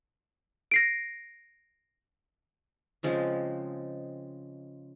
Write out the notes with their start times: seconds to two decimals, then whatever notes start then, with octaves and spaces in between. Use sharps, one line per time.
0.71 A#6 C7 D7
3.03 C#3 F3 G#3 C4